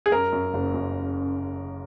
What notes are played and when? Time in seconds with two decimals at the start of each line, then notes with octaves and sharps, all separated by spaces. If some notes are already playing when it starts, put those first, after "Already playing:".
0.06 G#4
0.12 F#2 A#4
0.33 F#2
0.54 F#1
0.74 F#2